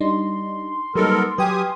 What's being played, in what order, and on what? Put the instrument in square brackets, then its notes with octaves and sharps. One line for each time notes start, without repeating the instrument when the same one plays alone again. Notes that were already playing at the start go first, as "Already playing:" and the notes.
[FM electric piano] G3 D4 D#4 [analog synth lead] C6
[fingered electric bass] F#3 A#3 [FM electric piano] G3 D#4 [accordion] B3 A4 A#4
[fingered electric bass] F#3 [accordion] G4 G#5 D#6 [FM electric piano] B4 G5 F6